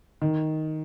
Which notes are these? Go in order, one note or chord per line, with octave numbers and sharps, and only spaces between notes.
D#3